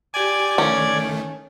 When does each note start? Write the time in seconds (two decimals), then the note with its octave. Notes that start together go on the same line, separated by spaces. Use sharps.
0.14 G4 D5 G#5 G#6
0.58 D#3 A3 C#4